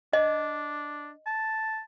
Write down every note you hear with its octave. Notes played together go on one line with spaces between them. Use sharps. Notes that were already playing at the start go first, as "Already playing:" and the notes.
D4 D#5
A5